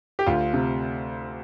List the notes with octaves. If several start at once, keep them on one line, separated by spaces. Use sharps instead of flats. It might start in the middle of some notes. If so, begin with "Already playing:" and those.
G4
D2 F4
C3